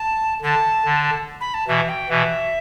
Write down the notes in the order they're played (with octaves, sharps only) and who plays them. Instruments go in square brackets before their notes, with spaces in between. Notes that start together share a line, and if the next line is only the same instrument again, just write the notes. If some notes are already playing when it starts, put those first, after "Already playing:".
Already playing: [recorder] A5
[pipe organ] D3 [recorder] A5
[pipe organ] D3
[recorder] B5
A5
[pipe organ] B2 E3 [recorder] E5
[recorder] G5
[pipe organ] B2 E3 [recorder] E5